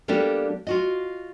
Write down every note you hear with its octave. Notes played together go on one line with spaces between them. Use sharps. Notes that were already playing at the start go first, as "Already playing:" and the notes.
G3 A#3 B3 D4 G4 A4
F4 F#4 D#5